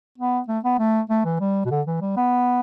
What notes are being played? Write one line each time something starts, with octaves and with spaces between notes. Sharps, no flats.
B3
A3
B3
A3
A3
E3
G3
B2
D3
E3
G3
B3